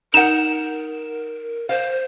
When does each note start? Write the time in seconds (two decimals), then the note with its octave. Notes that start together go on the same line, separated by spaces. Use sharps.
0.14 D#4 A#4 F#5 E7
1.69 C5 F5